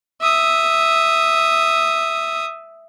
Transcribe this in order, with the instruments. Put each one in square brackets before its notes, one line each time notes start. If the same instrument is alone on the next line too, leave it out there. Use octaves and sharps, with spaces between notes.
[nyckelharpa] E5 D#6